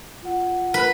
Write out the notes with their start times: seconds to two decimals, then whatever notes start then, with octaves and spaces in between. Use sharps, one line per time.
0.23 F4 F#5
0.74 B4